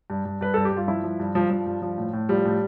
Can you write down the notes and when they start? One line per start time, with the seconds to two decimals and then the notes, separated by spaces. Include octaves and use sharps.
0.10 G2
0.25 G2
0.41 G2 B4
0.54 G2 A4
0.65 G4
0.72 G2 F4
0.88 F3 E4
1.04 F3
1.20 G2
1.35 G2 F3
1.50 F3
1.66 G2
1.82 F3
1.98 A2
2.13 A2
2.29 F3 G3
2.45 A2